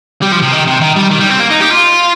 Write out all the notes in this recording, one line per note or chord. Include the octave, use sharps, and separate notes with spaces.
G3
F3
C3
D#3
C3
D#3
G3
D#3
G3
C4
A#3
D#4
G4
F4